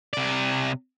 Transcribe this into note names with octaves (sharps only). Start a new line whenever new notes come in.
C3 D5